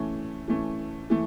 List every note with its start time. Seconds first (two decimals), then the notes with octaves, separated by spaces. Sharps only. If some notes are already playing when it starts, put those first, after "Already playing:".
Already playing: E3 A3 C#4
0.48 E3 A3 C#4
1.10 E3 A3